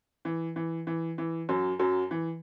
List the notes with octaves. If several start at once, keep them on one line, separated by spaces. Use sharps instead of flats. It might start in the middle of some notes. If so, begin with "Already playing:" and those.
E3
E3
E3
E3
F#2 F#3
F#2 F#3
E3